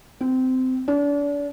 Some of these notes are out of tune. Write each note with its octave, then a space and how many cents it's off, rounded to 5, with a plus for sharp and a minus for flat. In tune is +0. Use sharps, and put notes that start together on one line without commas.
C4 -20
D4 -35